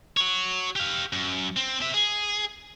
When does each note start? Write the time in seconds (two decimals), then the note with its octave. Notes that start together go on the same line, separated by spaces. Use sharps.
0.17 F#4 C#5
0.76 G4 F5
1.13 F#2
1.57 C4
1.81 C4 E5
1.94 G#4